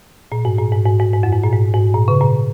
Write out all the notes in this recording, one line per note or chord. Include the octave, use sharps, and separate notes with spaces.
A#2
G#2
A#2
G#2
G#2
G#2
G#2
F#2
G#2
A#2
G#2
G#2
A#2
C#3
A#2